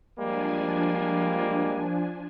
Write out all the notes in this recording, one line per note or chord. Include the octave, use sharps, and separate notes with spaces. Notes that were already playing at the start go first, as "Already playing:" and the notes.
F3 G3 G#3 A#3 D4 G#5